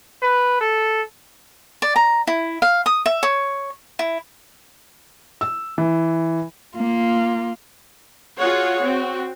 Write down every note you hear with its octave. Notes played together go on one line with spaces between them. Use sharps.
B4
A4
D5
A#5
E4
F5
D#6
E5
C#5
E4
E6
E3
A#3 F4
F4 F#4 G#4 C#5 F#5
C4 F#4